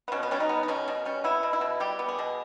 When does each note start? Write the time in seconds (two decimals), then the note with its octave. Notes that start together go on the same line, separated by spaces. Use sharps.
0.08 B3
0.12 B2 C#4
0.23 B3
0.31 G3 C#4
0.40 D#4
0.49 B3
0.63 D#4
0.68 B2 C#4
0.88 B2
1.05 G3 C#4
1.24 B3 E4
1.43 B2
1.53 E4
1.61 B2
1.80 G3 G4
1.99 B3
2.09 G#4
2.18 B2